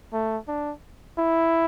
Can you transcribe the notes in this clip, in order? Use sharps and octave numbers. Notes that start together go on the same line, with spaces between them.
A3
D4
E4